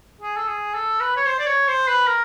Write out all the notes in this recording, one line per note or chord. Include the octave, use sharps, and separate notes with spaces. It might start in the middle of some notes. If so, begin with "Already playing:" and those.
G#4
A4
G#4
A4
B4
C#5
C5
D5
C#5
C5
B4
A#4